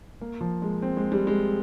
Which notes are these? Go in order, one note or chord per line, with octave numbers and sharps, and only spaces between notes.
A#3
F3
G#3
C4
G#3
G3
G#3